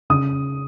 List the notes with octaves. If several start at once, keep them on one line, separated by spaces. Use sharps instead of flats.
C#3 D#6